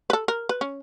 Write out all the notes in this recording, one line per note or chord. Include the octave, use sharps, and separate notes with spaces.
A4 B4
A#4
B4
C#4